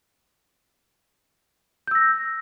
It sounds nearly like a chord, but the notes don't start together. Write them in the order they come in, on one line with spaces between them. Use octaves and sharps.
G6 E6 A#6